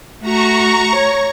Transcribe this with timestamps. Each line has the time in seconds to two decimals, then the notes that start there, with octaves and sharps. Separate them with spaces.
0.22 A3 F#4 A#5 C#6
0.95 C#5